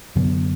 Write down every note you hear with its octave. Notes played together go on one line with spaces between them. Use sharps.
F#2 D3 F#3 B3